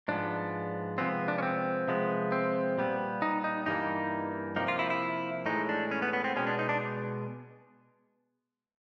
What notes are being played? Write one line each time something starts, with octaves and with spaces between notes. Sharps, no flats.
G#2 F3 G#3 B3 D4
C3 F3 G#3 B3 C4
D4
C#4
C4
C3 F3 G#3 B3
C4
A#2 G3 B3
D#4
D#4
G2 E3 G3 A#3 D#4
C3 F3 A#3 D#4
F4
E4
E4
A2 E3 G#3 D#4
D4
C#4
B3
B3
C4
B2 G#3 B3 C#4
D4
D#4
D4